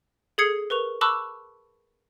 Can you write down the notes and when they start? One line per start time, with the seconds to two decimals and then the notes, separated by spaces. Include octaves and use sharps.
0.38 G#4 A4 D#6 G#6 C7 C#7
0.70 A#4 B4 C#6 F7
1.01 A5 B5 C#6 D6 E6 F#6